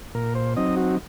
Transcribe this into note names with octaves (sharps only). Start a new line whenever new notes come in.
A#2 A#4
C5
F#3 C4 D#4 D#5
F#4